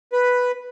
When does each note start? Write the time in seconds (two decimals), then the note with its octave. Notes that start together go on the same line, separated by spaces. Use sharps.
0.12 B4